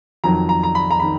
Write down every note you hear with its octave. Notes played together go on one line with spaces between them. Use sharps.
F2 D#3 F#3 A#5
A#5
A#5
B5
A#5
D#3 B5